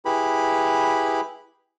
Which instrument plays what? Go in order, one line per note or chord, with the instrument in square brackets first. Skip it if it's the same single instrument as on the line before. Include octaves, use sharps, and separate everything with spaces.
[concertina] E4 G4 G#4 B4 B5